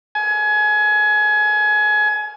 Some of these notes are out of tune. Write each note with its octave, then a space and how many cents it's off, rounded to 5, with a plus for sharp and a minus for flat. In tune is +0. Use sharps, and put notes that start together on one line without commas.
G#5 +25